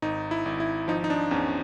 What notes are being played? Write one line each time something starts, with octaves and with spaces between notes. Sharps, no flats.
G#1 D#4
E4
G#1
E4
F3 D#4
D#4
D4
E2 C#4